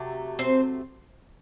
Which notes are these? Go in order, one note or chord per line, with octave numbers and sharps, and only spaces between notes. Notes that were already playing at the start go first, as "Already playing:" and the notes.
Already playing: C3 F#3 A3
C4 C5